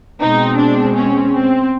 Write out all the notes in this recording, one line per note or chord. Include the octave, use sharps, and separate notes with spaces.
B2 G#3 C4 D#4
D4
C#4
C4